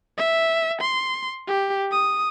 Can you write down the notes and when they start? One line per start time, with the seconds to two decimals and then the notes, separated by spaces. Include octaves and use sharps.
0.18 E5
0.81 C6
1.48 G4
1.91 D#6